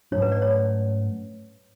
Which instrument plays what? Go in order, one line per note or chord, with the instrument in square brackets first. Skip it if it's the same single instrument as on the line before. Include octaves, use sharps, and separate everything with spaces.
[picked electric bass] G#2 F#3 A3 C#4 [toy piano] C#5
[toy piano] B4
D5
C#5